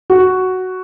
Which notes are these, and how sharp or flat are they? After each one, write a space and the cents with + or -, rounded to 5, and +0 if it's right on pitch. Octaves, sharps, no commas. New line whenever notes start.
F#4 +5